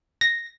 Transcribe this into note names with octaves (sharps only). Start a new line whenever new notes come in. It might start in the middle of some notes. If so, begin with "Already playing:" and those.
A#6